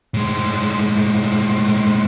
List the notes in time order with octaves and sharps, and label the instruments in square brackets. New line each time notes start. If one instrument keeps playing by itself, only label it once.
[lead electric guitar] A2 G#3